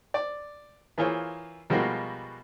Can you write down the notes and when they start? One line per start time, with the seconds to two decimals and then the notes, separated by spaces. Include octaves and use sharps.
0.14 D5
0.98 E3 A#3 F4 G#4 C5 C#5
1.70 B2 F3 G3 G#3 A#3 F#4